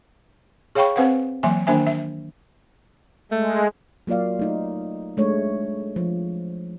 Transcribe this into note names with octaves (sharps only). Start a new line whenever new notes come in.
G#4 C#5 F5 G5 B5 C#6
C4 B4 C5 F5 F#5
E3 F#3 A#3 E5 G#5
D#3 A#3 D4 C5 E5 G#5
E5
G#3 A3
F#3 A#3 F4 D5 F5
A3 D#4
G#3 A3 D4 C#5
F3